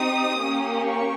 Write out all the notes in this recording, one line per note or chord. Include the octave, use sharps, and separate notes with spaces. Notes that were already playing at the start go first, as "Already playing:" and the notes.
Already playing: C4 D#4 G4 D#6
A#3 C#4 G4
C#6